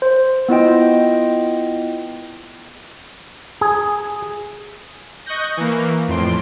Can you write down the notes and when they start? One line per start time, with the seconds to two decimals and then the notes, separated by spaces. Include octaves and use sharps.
0.02 C5
0.49 B3 E4 F4 D#5 G5
3.61 G#4
5.26 D#5 C#6 F#6 G6 A#6
5.57 E3 A#3
6.08 F2 A2 C6 D7